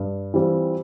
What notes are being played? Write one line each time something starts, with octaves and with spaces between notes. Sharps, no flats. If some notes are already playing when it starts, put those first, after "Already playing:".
Already playing: G2
E3 G3 C4 F4